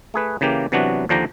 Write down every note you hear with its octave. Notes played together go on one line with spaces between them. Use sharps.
A3 G#4 B4
C#3 E3 A#3 G4
C3 E3 F#3 B3 D4 F#4
D#2 D3 F3 D4 G5 A#5